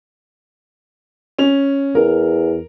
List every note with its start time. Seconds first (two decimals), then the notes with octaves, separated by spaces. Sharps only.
1.39 C#4 F7
1.95 E2 A#4